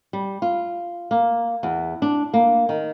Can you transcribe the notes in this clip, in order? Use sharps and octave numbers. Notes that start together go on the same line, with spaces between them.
G3
F4
A#3
E2
D4
A#3
D#3